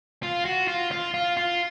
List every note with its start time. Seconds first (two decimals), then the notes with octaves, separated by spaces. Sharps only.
0.23 F4
0.45 F#4
0.68 F4
0.91 F4
1.14 F4
1.37 F4